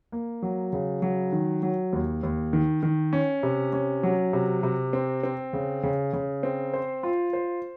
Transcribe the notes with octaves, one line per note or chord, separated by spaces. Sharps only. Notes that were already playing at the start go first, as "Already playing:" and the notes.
A#3
F#3
C#3
F#3
D#3
F#3
D#2
D#2
D#3
D#3
C#4
C3
C#4
F#3
C3
C3
C4
C4
C#3
C#3
C#3
C4
C5
F4
C5